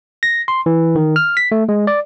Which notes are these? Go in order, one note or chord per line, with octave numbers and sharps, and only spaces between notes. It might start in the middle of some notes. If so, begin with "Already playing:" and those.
A#6
C6
E3
D#3
F6
B6
A3
G#3
D5